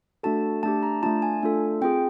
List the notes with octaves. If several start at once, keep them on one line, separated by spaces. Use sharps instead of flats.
A3 D4 F#4 A4 A5
A3 D4 G4 A5
A#5
A3 D4 F4 A5
G#5
A3 D4 F4 A4
C4 F4 G#4 G5